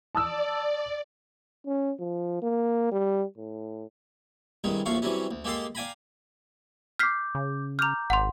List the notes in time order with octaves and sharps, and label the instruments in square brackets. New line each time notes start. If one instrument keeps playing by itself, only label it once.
[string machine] D5 [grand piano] A5 D#6 E6
[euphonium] C#4
F3
A#3
G3
A2
[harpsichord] C2 G2 D#3 G#3
A1 D#2 F3 A3 F5 C#6
C3 E3 F#3 G3 C#4
D2
G#3 A#3 G4 A4 C6
D5 F5 G5 G#5 A#5 B5
[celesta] D6 G6 [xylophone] F6 B6 C7
[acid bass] C#3
[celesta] A#5 D6 G6 [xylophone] F6 F7
[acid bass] G#1 [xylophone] F#5 C6